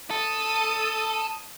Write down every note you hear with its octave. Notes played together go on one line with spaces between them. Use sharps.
A4 D#6